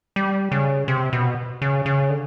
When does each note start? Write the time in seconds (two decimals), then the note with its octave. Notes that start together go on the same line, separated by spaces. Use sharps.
0.16 G3
0.52 C#3
0.88 C3
1.13 B2
1.62 C#3
1.86 C#3
2.10 D3